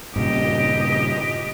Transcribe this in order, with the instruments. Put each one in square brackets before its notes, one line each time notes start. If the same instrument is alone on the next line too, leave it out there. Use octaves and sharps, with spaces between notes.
[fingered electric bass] G2 A#2 C#3 [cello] G4 D#5